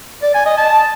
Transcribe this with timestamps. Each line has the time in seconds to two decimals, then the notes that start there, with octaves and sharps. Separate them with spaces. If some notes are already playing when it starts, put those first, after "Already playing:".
0.23 D5
0.34 G#5
0.46 D#5
0.57 A5